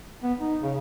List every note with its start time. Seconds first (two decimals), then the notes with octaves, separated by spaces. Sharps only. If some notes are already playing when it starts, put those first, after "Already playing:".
0.23 B3
0.39 D#4
0.63 C#3